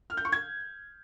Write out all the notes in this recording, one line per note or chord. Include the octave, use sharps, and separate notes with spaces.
F6
G6
C#6
G#6